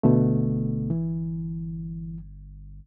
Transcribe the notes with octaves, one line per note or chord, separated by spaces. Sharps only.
G1 B2 D3 A3
E3